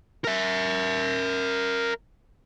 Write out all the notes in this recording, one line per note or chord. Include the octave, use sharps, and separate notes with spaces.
A#4 E5